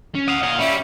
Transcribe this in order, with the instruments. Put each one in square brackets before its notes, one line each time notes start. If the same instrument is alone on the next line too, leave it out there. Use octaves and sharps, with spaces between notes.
[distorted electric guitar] C#4
[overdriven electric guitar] D#5 F5 [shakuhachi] F#5
[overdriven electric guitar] A#2 F5 [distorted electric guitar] D#5
[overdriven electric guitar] G3 [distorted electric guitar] C#4 [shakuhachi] E5